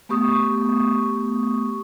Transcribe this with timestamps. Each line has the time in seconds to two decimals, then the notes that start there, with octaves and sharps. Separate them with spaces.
0.09 A3 B3 G4 C#6 D#6